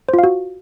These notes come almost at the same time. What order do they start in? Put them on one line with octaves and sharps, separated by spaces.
C5 F4 F5 F#4